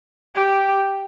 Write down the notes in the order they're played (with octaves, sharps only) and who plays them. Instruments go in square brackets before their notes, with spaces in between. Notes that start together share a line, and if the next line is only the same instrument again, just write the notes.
[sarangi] G4